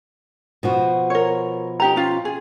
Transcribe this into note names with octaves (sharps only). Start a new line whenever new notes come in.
B2 F3 F#4
A#4 C#5
D#4 G4 A#5
C#4 F4
G#4